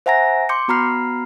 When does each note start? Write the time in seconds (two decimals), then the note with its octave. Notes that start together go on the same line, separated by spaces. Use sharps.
0.06 C5 E5 F#5 G#5 A#5 A#6
0.49 C6 D6 G6 C#7
0.68 B3 F#4 A#5 B5 F6 C7